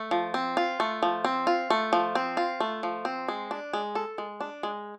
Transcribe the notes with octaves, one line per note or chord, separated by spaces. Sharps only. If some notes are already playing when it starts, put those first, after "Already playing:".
Already playing: A3
F3
C4
F4
A3
F3
C4
F4
A3
F3
C4
F4
A3
F3
C4
G#3
D4
G#3
A4
G#3
D4
G#3